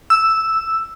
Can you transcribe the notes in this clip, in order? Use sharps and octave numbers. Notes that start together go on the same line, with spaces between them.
E6